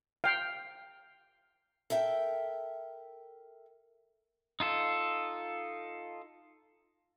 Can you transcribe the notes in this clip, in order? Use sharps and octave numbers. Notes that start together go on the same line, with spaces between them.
F5 G5
A4 A#4 E5 G5
D#4 F4 A4